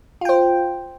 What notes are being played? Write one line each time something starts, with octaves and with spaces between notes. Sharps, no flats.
F4 C5 G5